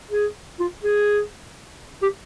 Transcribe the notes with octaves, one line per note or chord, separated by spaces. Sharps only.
G#4
F4
G#4
G4